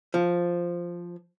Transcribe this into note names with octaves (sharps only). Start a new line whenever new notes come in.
F3